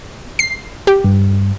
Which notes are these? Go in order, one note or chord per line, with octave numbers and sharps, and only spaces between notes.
C7
G4
G2